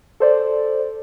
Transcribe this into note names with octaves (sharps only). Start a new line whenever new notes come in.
A4 C5 D5